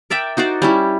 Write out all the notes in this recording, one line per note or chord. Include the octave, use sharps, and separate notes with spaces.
A#4 D5 E5 G5
D#4 F#4 C5 D5
G3 C#4 E4